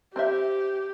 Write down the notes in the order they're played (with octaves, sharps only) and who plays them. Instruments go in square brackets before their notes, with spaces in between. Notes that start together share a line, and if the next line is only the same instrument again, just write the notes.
[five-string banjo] C4 C5 E5 [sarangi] G4